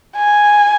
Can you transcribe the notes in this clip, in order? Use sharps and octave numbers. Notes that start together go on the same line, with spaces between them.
G#5